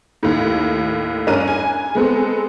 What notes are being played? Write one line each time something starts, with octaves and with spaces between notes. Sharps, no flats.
D#2 A2
G2 C#4 D4 A#4 D#7
G#5
G#3 B3 C4 A4